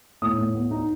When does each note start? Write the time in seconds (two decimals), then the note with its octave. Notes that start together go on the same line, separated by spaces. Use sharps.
0.22 A2 D#6
0.38 A2
0.55 B3
0.71 D#4